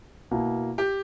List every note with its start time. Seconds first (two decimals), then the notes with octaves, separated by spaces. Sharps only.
0.31 B2 A#3 E4
0.78 G4